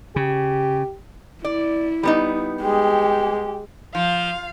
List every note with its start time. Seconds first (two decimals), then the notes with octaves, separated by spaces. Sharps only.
0.16 C#3 G4
1.45 E4 D5
2.03 G3 B3 D#4
2.62 G#3 G4 G5
3.95 F3 F5